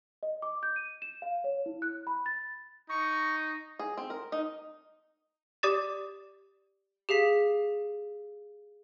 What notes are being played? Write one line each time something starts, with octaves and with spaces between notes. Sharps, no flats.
D#5
D6
G6
D#7
E7
F5
C#5
E4
F#6
B5
A6
D#4 C#6
G#4
C4
A#4
D#4
G4 D5 D6 D#6 A6 E7
G4 G#4 F5 B6